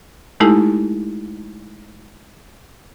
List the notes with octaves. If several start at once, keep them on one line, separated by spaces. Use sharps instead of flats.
G#3 A3 D#4 E4 G4 A4